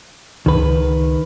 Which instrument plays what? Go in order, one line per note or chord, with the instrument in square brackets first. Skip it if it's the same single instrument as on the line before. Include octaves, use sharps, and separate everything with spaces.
[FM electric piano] C#2 [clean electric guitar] D#3 B4